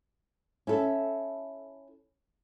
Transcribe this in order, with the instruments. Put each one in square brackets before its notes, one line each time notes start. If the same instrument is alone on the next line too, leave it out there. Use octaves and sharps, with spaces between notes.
[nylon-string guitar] C#4 E4 A4